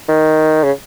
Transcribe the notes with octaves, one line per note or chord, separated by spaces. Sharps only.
D#3
C#3